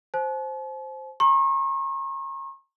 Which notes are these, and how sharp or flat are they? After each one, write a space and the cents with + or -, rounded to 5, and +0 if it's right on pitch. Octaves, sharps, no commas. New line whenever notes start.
C5 +5 A5 -45
A#5 +0 C#6 -40